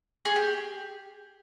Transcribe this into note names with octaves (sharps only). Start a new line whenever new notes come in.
G#4
G4